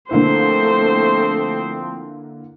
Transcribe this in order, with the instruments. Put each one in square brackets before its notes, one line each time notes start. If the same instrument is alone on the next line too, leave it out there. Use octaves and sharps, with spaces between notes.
[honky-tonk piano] D3 A#3 E4 [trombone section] F3 C4 [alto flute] A3 [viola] C5